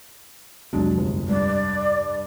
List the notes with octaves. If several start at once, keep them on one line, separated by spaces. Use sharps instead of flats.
C2 F2 F#3 G#3 D4
G1
G2 D5